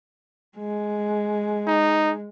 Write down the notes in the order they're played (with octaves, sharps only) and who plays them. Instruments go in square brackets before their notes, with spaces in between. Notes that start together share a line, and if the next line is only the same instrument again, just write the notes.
[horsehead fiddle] G#3
[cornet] D#4